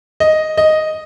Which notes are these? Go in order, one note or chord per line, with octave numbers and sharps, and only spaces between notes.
D#5
D#5